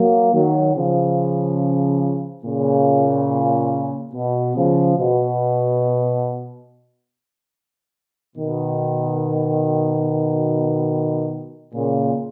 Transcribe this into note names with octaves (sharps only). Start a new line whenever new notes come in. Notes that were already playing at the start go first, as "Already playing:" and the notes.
Already playing: F#3 A#3
D#3 F#3
C#3 F3
A#2 C#3
B2
C#3 F3
B2
B2 D#3
A#2 C#3